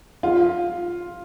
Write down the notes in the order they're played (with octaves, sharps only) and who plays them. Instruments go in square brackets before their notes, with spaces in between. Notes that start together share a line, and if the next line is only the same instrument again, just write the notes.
[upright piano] F4